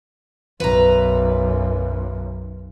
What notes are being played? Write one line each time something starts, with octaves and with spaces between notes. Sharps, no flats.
B1 F#2 B4 A#5